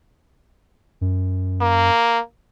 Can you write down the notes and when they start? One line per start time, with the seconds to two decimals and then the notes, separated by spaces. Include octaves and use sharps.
1.01 F#2
1.61 A#3